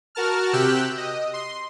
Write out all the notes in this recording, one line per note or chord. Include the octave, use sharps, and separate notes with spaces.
F#4 A#4 A5 F6
C3 G4 G5 E6 F#6
D#5
C6